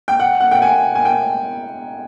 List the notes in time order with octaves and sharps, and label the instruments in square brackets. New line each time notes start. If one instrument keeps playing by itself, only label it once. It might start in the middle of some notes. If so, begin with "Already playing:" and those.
[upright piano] G5
F#5
F#5
G5
G#5
G#5
G5